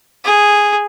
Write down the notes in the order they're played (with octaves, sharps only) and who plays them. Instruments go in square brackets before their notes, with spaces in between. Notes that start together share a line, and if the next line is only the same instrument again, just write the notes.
[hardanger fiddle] G#4